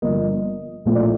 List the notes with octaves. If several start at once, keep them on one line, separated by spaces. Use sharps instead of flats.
G1 G2 F3 A#3 D#5
A#1 A2 F3 A3
D5